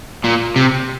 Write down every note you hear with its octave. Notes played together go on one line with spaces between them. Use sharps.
A#2
C3